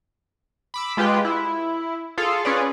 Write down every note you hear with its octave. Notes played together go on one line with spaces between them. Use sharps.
B5 D6 E6
G#3 F4 G4 B4 G5
E4
F4 G#4 A4 F5
C#4 F4 G#4 B4 C#5 D5